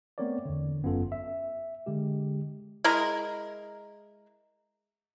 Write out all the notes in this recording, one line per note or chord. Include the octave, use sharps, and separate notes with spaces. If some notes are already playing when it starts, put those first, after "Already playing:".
A3 B3 C4 A#4 C#5 D5
E2 D3
G1 F#2 B3 C#4 F4 A4
E5
D3 G#3 G4
G#3 E4 G#4 A#4